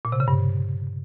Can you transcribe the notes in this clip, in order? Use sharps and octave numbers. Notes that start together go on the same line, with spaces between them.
A#2
C3
C#3
G2